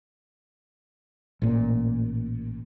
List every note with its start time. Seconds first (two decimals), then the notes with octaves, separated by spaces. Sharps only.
1.42 A1 A#2